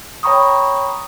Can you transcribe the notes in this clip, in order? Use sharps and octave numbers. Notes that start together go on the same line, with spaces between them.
C#5 G5 A#5 B5 C#6 D#6